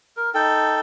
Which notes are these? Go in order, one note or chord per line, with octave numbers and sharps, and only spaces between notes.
A#4
D#4 A4 G5